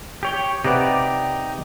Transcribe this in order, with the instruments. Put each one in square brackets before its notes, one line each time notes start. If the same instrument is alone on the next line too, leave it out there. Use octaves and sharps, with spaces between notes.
[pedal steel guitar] G4 C#5 G5
[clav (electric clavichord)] C3 B4 F#5 [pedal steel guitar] D#4 G4 D5